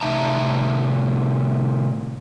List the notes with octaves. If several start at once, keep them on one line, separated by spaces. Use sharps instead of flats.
A2 C3 D#4 E5 A5 A#5